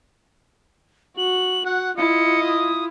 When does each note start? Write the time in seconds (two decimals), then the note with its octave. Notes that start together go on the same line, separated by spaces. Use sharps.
1.18 F#4 F#7
1.66 F#4 F#5 F#6
1.97 E4 F4 D#5 C#7
2.43 D#6